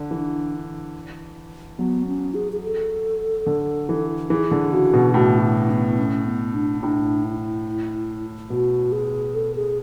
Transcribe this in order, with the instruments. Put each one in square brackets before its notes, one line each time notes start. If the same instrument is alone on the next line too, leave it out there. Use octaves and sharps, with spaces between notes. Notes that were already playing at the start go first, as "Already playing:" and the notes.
Already playing: [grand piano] D3
[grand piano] E3 [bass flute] D4
[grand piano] F#3 [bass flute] B3
[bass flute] C#4
G#4
G#4
A4
[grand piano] D3
E3
[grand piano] E3 [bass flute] G#4
[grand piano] D3
[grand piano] C#3 [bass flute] F#4
[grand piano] B2
[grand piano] A2 [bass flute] F#4
[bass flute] E4
B3
C#4
B3
D4
[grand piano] A2 [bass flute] D4
[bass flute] E4
[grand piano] B2 [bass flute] F#4
[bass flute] G#4
A4
G#4